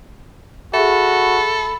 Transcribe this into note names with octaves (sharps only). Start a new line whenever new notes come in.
F#4 G#4 A4 E5 B5